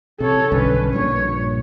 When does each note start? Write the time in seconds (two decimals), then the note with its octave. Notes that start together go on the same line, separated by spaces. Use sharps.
0.20 C3 A4 C#5
0.52 B1 G2 D3 C#4 B4
0.93 A#1 G2 A#2 C#5